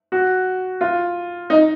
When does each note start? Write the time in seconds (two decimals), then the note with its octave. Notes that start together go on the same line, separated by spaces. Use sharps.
0.12 F#4
0.81 F4
1.50 D#4